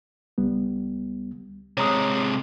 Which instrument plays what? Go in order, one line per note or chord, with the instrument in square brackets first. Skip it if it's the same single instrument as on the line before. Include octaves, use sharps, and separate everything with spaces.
[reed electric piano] C#2 G3 B3
[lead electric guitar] C3 G#3 [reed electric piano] C#5 A#5 D#6